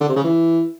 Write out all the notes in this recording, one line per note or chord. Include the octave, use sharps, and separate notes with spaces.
D3
C3
C#3
E3